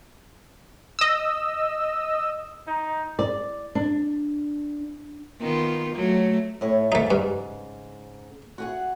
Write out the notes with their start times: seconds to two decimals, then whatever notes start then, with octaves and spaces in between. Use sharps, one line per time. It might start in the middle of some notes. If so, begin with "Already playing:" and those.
0.99 D#5 E6
2.67 D#4
3.19 D5
3.75 D4
5.40 D#3 B3 F4
5.96 F#3 A3
6.61 A2 C#5
6.92 G#2 C#3 A3 D#4
7.11 G2
8.58 F#4 G#4 F#5